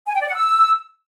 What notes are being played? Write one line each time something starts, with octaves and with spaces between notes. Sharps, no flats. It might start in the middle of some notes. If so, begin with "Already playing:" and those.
G#5
G5
D5
F#5
E6